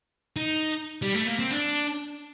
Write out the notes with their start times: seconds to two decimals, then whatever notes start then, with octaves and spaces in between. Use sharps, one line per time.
0.36 D#4
1.02 G3
1.15 A3
1.26 A#3
1.39 C4
1.51 D4